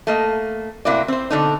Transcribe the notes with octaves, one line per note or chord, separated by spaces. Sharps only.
A3 A#3 D#5
A2 C3 A#3 E4 F#4 D5
C4 C5
B2 D3 D4 D#4